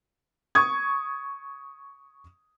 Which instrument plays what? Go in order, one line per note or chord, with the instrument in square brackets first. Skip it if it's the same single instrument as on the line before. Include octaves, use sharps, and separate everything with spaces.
[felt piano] C#6 D#6 G#6